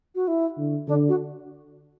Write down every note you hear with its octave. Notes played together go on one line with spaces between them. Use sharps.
F#4
E4
D3
D3 D4
F#4